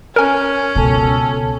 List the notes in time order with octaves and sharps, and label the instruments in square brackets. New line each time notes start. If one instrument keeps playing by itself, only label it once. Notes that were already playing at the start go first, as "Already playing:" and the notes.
[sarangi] C#4 [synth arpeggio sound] A#4 G#5
[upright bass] C#2 B2 [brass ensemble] A4